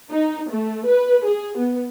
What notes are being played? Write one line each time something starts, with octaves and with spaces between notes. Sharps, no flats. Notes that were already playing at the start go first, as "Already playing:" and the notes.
D#4
A3
B4
G#4
B3